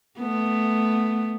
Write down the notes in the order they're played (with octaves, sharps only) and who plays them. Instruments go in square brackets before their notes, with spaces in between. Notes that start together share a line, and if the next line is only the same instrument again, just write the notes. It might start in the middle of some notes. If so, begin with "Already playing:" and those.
[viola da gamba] A3 B3